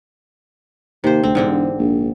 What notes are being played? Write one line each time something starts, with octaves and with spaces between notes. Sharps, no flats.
D#2 C3 C5
D2 C4
E1 G#2 D3 C4
A#1